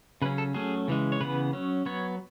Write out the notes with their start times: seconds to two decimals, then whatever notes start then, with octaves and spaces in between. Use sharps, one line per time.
0.22 C#3 F#3 C#4 B4
0.38 A4
0.54 F#3 A3 C#4 G#4
0.88 C#3 E3 G#3
1.12 C#5
1.20 C#3 E3 B3 B4
1.53 F#3 C#4
1.86 F#3 B3 C#5